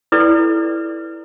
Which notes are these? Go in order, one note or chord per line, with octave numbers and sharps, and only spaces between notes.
E4 A4 B4 D5